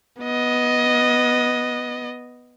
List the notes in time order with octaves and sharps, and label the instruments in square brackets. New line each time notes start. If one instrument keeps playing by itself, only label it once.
[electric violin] B3 D#5